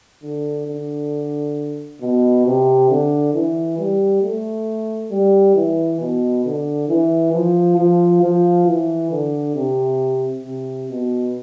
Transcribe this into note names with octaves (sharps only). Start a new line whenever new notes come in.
D3
D3
B2
C3
D3
E3
G3
A3
G3
E3
B2
D3
E3
F3
F3
F3
E3
D3
C3
C3
B2